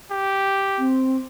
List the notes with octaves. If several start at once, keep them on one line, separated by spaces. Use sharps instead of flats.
G4
C4